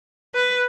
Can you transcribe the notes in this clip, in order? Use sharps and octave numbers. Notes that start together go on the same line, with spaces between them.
B4